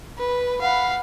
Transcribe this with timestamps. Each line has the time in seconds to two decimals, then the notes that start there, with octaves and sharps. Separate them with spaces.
0.19 B4
0.61 F5 F#5 B5